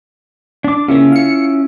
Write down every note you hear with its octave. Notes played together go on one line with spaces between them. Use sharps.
D4 D6
C#3 A#3 C#4 E4 F4
F5 C#7